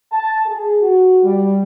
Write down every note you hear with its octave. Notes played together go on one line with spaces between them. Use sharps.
A5
G#4
F#4
G3